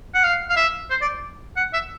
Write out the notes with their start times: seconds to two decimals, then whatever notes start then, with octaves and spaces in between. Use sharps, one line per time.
0.14 F#5
0.24 F5
0.50 F5
0.56 E5
0.90 C5
1.01 D5
1.57 F#5
1.73 E5